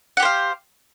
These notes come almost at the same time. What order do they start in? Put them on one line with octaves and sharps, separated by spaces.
F#5 G4 C5 F5